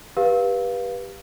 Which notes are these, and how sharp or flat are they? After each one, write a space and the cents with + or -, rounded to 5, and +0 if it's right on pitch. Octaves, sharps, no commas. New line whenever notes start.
G4 +10 B4 -20 F5 +0